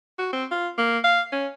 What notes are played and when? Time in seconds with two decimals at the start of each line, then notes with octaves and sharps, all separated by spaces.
0.19 F#4
0.33 C4
0.51 F4
0.78 A#3
1.04 F5
1.32 C#4